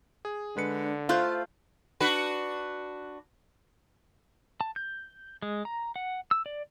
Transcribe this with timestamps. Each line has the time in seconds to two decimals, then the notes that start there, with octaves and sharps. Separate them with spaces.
0.25 G#4
0.57 D3 G#3 D4 B4 C#7
1.09 A3 F4 C5 F5 F#6 G6
2.00 D4 F#4 B4
4.61 A5
4.76 G6
5.42 G#3
5.65 A#5
5.96 F#5
6.31 E6
6.46 D5